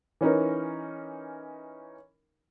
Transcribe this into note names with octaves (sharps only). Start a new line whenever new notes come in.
E3 C#4 D#4 A#4